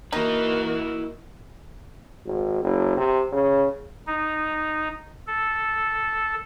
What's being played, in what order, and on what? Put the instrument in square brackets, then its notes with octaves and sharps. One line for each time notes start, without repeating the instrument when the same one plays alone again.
[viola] A#3 F#4 [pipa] D#4 [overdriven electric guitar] E4 B4
[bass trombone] G#1
F#1
C3
C#3
[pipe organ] D#4
A4